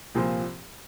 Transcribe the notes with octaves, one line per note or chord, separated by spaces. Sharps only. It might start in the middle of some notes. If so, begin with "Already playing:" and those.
C2 A#2 F3 C4